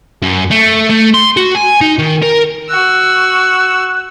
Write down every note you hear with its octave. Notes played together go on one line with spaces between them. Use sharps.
F#2
A3
A3
C6
F#4
G#5
D#4
D#3
A#4
F#4 E6 F#6